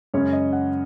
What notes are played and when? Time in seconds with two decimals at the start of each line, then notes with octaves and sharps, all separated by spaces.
0.14 F#2 C#3 G#3 C#4 C#5
0.33 D#5
0.53 F#5